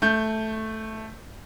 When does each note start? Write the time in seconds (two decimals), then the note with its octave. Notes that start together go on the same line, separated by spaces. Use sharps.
0.02 A3 G6